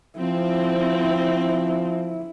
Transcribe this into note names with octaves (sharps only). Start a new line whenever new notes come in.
F3 C4 E4